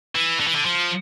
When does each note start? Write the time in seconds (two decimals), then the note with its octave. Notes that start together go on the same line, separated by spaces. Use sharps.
0.15 E3
0.40 D3
0.48 E3
0.56 D3
0.66 F3